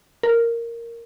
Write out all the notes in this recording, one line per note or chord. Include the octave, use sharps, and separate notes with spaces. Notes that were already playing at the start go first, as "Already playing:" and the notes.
A#4